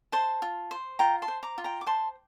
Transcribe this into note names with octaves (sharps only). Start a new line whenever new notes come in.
C5 A5 C6
F4
C5
F4 G5 A#5
A5 C6
C5
A#5 D6
F4
G5 A#5
D6
C5 A5 C6